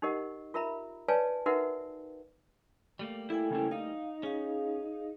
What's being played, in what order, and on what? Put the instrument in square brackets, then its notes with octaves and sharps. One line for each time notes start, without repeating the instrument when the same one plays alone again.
[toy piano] D#4 G4 A#4 D#5 F#5
F4 A#4 E5 A#5 B5
B4 C#5 D5 F5 G#5 A5
D#4 F#4 A#4 B4 E5 F#5
[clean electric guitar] G3 A3 A#3
[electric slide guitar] E4 [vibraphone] A4 G5 G#5
[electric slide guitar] C#3 C#4 E4
[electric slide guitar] D#4 [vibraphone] F5
[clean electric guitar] C#4 [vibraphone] G#4 F5